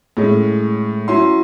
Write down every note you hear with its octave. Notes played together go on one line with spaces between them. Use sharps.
A2 G#3 C#4
F#3 C#4 E4 C6